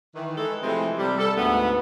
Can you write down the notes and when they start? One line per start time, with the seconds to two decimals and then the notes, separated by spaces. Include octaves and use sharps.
0.16 D#3 E3
0.37 E3 G#3 A4
0.63 C3 E3 F3 G#3 A3 C4
0.99 C3 G3
1.18 A4
1.37 D2 G#2 A3 B3